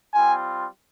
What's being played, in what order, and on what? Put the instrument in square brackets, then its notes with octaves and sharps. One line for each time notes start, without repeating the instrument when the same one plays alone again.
[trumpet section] G3 C4 F4 G#5